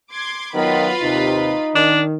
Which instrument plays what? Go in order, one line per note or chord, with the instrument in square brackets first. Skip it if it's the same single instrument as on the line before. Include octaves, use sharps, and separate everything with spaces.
[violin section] C6 D6 G#6
[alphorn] D#3 [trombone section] F#3 B3 [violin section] F4 B4 B5
[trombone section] D#2 C3 [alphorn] D#4
[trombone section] D#3 [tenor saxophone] D4